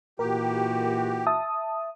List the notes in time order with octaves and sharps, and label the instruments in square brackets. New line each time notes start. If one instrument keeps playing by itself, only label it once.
[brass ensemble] A#2 E3 F#4 [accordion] G4 [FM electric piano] A#4
[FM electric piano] E5 A5 D#6